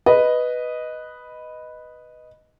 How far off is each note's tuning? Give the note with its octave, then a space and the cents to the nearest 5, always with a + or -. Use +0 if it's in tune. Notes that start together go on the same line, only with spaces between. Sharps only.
B4 +0 D#5 +0